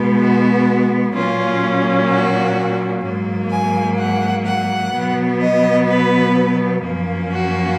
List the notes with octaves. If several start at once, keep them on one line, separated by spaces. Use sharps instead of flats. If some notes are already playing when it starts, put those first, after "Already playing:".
Already playing: B2 G#3 B3
F#4
A#2 F#3 A#3 C#4 F4
F#4
G#2 F#3 A#3
G#5
F#5
F#5
B2 F#3 B3
D#5
B4
F#2 F3 A#3 C#4
F#4